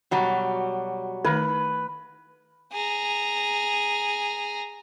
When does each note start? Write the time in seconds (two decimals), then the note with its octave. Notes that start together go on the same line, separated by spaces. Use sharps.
0.11 B2 F#3 G3
1.25 D#3 A3 D#4 B4
2.72 G#4 A#5